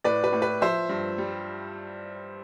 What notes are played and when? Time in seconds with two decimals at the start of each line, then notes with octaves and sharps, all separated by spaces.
0.04 A2 B4 D5
0.24 B4
0.33 A2
0.42 B4
0.61 F3 C5 E5
0.89 G2
1.18 G3